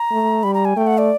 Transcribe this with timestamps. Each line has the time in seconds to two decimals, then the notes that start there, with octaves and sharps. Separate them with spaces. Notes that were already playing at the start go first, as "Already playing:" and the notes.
Already playing: A#5
0.12 A3
0.43 G3 B5
0.54 A#5
0.65 G#5
0.76 A3 G5
0.87 F#5
0.98 D5